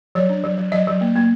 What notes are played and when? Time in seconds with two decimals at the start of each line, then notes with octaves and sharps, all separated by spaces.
0.15 F#3 C#5
0.30 D4
0.44 F#3
0.58 F#3
0.72 F#3 D#5
0.87 F#3
1.01 A#3
1.15 A#3